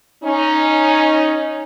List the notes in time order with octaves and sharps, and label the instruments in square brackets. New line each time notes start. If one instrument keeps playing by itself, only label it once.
[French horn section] C#4 D#4